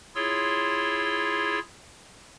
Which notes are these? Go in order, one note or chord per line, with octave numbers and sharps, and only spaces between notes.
E4 F4 G#4 C#5 C6 E6